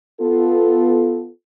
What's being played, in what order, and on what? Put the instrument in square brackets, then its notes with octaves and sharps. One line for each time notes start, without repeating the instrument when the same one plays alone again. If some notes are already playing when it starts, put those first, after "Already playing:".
[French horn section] B3 F4 A4